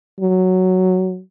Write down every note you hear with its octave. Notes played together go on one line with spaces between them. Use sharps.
F#3